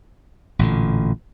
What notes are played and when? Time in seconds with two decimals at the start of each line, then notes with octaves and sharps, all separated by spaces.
0.59 A1 A#2 D3